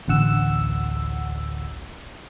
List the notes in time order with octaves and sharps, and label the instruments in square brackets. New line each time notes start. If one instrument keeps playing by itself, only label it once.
[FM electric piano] A1 D2 F#5 E6